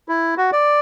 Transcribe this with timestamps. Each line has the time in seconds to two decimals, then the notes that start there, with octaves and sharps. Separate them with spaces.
0.08 E4
0.38 F#4
0.52 D5